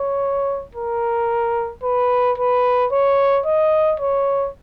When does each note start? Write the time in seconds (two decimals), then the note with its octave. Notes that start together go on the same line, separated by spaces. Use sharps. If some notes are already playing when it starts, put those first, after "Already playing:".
Already playing: C#5
0.75 A#4
1.83 B4
2.38 B4
2.92 C#5
3.46 D#5
4.00 C#5